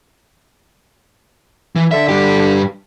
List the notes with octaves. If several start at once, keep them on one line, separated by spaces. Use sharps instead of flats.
E3
D3 E5
G2 G4